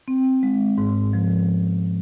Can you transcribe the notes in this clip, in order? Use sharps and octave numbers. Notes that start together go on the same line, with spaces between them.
C4
G#3
G#2
F3